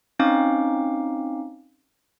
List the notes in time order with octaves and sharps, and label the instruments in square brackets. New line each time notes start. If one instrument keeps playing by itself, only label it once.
[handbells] C4 C#4 D#4 F5 D6